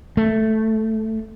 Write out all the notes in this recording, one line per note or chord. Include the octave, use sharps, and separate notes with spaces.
A3